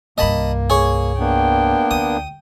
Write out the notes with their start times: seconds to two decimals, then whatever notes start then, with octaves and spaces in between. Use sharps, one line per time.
0.18 C2 G2 A#3 D#5 A5 B5
0.70 G#4 C#5
1.20 A#3 B3 D4 G5
1.91 D2 D#6